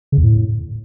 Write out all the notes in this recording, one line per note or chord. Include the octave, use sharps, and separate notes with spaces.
C#3
E2
A2